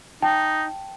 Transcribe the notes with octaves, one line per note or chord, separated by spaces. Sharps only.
D#4 G5 A5